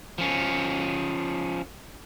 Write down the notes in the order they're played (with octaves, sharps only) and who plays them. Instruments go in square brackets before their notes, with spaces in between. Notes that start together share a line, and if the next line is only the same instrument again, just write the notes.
[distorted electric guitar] F3 C#4